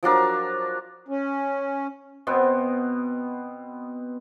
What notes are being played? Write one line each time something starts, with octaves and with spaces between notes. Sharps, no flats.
F3 F#3 D4 A#4
C#4
B2 B3 C4